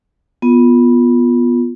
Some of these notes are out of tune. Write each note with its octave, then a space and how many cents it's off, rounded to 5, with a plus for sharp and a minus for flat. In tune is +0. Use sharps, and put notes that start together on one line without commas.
B3 -10 F4 +0